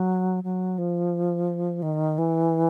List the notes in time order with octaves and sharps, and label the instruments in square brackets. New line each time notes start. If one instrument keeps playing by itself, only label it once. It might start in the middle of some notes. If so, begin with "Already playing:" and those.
Already playing: [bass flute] F#3
F#3
F3
D#3
E3